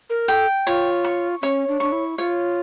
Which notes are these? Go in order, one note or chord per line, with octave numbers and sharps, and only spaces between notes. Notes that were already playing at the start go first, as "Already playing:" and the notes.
A#4
A4 G5
F4 C#5
C#6
C#4 C#5
D4
D4 C#6
E4
F4 C#5